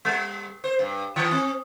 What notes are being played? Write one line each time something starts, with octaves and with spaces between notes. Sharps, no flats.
G3
C5
G2
D#3
C4